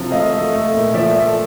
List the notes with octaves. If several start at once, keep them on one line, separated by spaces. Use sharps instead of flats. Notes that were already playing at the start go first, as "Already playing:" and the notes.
Already playing: C3 F3 F#3
A3 D#5 F5
A3
A3
A#2
F3 D5 E5
A3